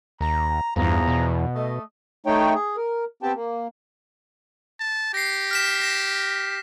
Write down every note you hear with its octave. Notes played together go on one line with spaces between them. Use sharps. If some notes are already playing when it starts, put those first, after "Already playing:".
D#2 A#5
E2 G2 F3 G#4 A#5
B2
A3 D#5
A3 D#4 C#5 G5
G#4
A#4
B3 C4 G4 G5 A5
A#3
A5
G4 A#6 C7
F6 B6 E7
A#6 E7